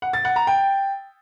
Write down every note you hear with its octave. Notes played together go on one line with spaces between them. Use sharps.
F#5
A6
F#5
A#5
G5